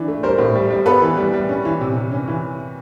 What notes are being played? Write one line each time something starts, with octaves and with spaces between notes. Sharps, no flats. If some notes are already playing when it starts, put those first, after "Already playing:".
Already playing: E3 D4
A3
G3 A#4 C5
A2
G3
G3
B3 A4 B4
E3
G3
G3
C#4
E3
C3
C3
C#4
E3